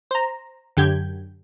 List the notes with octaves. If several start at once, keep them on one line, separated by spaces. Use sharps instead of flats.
C5 A#5
F#2 D3 G4 G6 G#6